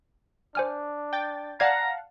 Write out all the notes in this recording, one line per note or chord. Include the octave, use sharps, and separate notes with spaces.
D4 C5 G#5 F6
G5 A6
D5 F5 F#5 A5 A#5 G#6